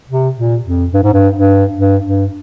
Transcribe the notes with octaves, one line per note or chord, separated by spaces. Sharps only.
C3
A#2
F2
G2
G#2
G2
G2
G2
G2